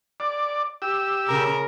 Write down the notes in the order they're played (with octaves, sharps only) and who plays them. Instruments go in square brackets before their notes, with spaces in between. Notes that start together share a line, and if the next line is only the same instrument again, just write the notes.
[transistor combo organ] D5
G4 E6
[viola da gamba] C#3 A#4